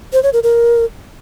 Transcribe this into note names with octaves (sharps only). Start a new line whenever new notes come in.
C5
C#5
A#4
A#4